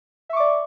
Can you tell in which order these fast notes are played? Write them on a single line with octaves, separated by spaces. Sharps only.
E5 C#6 D6 D5